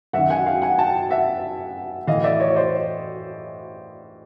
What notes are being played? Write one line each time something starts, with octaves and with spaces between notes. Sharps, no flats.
F#2 D#3 E5 F#5
F#5 G#5
F5 G5
F#5 G#5
G5 A5
E5 F#5
A2 E3 D#5 F5
D5 E5
C#5 D#5
C#5
C5 D5